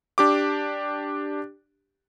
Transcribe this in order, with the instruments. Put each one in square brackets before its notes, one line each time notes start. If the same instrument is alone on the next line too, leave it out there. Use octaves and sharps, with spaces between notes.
[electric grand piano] D4 G4 D6